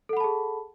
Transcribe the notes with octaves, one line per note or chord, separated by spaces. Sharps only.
G#4 A4 F#5 A5 B5